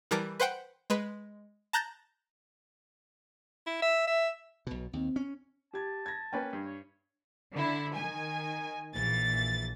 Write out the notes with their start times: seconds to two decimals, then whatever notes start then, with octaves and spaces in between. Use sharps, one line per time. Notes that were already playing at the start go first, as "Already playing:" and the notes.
0.11 E3 G3 A#4 A5 D6
0.40 B4 C5 F#5 G5
0.90 G#3 B4
1.73 A5 A#5 F#6 G6 A6 A#6
3.67 E4
3.82 E5
4.07 E5
4.67 B1 B2
4.93 D#2 C4
5.16 C#4
5.73 G4 A5 G#6
6.06 G#6 A#6
6.33 A#3 C#4 B4 G5
6.53 G2
6.65 C#5
7.53 D3 E4
7.95 D#3 G#5
8.93 A#1 E3 A6